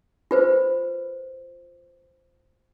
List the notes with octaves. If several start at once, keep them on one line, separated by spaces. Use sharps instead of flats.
F4 B4 C5